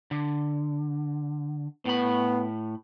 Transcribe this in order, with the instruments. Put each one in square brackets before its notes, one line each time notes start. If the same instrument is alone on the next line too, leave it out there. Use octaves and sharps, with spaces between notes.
[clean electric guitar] D3
[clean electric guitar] A2 B5 [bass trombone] B3